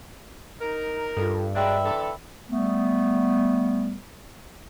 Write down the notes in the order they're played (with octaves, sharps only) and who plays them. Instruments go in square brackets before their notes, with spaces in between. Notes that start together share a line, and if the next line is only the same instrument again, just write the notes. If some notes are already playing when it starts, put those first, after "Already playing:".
[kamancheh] D#4 [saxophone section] A#4
[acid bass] G2 [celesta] F4 A4
[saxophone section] F#3 G#3 D4 [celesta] D5 G5 [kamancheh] E5 B5
[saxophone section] D3 E3 A4
[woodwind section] G3 A3 B3